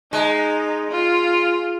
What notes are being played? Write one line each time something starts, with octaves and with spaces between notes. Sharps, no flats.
G#3 D#4
F4